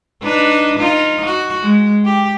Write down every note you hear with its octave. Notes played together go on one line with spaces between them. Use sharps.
D4 D#4 B4
D#4 F4
F#4
G#3
G4